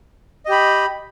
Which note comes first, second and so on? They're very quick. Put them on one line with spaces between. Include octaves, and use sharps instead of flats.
D#5 G4 B5